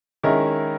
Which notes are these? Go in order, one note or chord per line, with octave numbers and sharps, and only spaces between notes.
D#3 G#3 C#4 E4 A#4